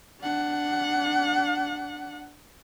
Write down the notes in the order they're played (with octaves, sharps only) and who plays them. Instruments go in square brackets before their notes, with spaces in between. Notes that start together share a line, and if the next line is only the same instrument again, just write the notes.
[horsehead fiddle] D4 F#5